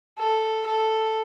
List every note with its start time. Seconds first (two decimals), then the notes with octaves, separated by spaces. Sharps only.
0.19 A4
0.66 A4